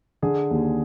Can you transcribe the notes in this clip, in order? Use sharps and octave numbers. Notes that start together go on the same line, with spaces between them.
D3 G#4
D#2